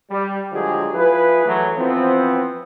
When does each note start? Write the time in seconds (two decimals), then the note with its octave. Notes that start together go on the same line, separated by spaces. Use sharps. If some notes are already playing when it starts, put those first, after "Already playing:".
0.10 G3
0.52 D3 F3 F#3 G#3 G4 G#4
0.94 F3 E4 G#4 B4
1.46 E3 F#3 A3
1.77 E3 F3 B3 C4